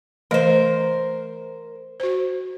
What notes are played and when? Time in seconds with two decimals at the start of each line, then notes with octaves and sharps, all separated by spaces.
0.31 E3 A3 A#4 C5 D#5
2.00 F#4 C5